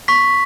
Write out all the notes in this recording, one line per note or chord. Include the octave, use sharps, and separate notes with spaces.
C#6 B6